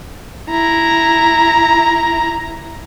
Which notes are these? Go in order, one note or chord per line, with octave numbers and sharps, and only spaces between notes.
E4 A#5